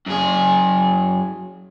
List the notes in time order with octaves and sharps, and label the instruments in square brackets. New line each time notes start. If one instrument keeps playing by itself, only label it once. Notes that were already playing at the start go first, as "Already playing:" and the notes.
[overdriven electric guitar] F#2 G#4